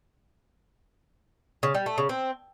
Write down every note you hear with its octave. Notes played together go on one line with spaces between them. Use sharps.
C#3
G3
A3
C#3
C4